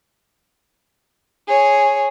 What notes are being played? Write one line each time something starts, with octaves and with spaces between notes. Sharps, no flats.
G#4 C#5